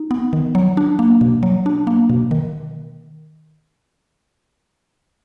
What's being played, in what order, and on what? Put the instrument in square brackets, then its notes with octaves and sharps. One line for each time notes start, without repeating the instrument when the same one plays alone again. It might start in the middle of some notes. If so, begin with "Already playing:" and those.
Already playing: [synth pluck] D#4
B3
D#3
F#3
D4
A#3
B2
F#3
D4
A#3
B2
D#3